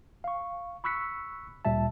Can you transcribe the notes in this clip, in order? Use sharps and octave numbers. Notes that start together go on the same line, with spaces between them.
F5 C#6
B5 C#6 E6 F#6 B6 C#7
D2 A#2 G3 E5 A5